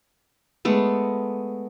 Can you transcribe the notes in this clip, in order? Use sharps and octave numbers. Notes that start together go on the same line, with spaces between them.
G#3 A3 B3